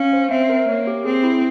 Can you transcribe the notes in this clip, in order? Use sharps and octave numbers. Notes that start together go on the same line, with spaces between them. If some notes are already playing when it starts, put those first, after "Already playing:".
Already playing: C#4 F5
C5
C4 E5
A#4
A#3 C#5
G4
C4 G#4
E4